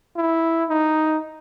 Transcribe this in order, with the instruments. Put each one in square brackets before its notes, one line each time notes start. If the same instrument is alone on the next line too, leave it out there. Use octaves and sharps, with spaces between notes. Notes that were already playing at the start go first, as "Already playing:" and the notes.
[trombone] E4
D#4